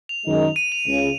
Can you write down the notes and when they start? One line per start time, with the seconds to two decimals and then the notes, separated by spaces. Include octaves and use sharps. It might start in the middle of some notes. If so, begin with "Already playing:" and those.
0.09 F7
0.25 F#2 D#3 G#3 D#4
0.56 D#7
0.72 F7
0.87 C#2 C#3